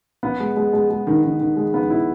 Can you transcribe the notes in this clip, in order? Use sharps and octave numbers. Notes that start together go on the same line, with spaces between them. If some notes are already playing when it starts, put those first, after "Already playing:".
B3
G#3
G#3
G#3
G#3
D#3
D#3
D#3
G#3
B3
E4